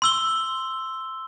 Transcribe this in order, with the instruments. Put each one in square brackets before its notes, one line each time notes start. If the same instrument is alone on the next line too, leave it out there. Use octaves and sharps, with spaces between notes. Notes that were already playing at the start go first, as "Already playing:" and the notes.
[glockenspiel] C6 E6 G7